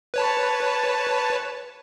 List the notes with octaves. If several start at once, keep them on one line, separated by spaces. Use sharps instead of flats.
B4 C#5 A5